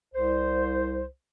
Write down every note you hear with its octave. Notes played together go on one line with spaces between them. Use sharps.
C2 C5